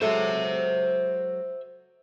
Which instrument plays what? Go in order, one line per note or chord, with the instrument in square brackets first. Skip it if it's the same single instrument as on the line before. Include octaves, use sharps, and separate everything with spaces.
[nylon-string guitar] F#3 G#3 A4 [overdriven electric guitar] C5 E5